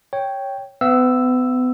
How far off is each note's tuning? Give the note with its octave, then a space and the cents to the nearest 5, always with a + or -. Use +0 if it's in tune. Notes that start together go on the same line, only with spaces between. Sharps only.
C#5 +0 G5 +0
B3 +35 F5 -25 E6 +0